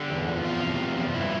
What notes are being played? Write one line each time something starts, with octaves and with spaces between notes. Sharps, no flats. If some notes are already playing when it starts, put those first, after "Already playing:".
Already playing: D3 G4
E2
F3
E2 F4
C3
E2
F3
G2 E4